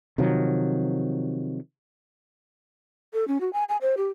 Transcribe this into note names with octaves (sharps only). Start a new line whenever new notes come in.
C3 D#3 F3 F#3
A4
C#4
F#4
G#5
G#5
C5
G4